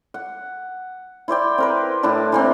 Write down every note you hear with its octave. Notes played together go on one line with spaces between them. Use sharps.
F#5
E4 C5 D5 G5
C4 A#4 B4
A2 D4 E4 A5
E3 A#3 C4